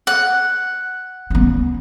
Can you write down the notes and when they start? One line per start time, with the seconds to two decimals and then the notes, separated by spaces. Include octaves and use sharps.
0.07 F#5
1.30 B3 C#4